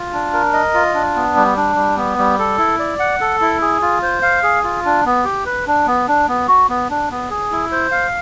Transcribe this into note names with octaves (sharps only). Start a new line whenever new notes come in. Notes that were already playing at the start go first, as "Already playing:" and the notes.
Already playing: F4
D4
A#4
D#5
F4
D4
B3
G3
D4
G3
B3
G3
A4
E4
D5
F#5
A4
E4
G#4
F4
C5
F5
G#4
F4
D4
B3
G4
B4
D4
B3
D4
B3
F#4
B3
D4
B3
G#4
E4
C5
F5